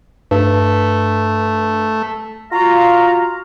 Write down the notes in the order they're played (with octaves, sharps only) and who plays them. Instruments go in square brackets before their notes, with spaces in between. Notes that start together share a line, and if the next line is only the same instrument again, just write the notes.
[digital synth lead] G2 [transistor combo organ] A3
[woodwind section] F4 F#4 F5 A#5